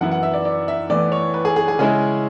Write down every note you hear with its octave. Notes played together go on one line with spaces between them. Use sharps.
F#2 E3 B3 E4 F#5
F#5
E5
D5
D5
E5
A2 E3 B3 D5
C#5
B4
G#4
G#4
G#4
C#3 G#3 C#4 E4 G#4